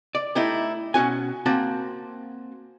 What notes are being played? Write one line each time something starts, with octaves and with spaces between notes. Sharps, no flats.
D5
A3 D#4 E4 G4
B2 C#4 F#4 G#5
A#3 C4 F#4 A5